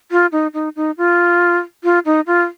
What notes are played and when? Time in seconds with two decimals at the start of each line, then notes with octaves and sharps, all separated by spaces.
0.11 F4
0.32 D#4
0.54 D#4
0.76 D#4
0.98 F4
1.84 F4
2.06 D#4
2.27 F4